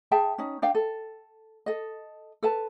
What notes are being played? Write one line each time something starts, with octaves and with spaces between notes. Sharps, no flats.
G#4 E5 G5 A5
C#4 D#4
D4 F5 G5
A4
A4 D#5
A4 B4 A5